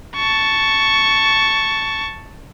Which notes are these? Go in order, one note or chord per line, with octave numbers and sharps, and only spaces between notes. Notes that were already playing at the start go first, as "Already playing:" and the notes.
A5 C#6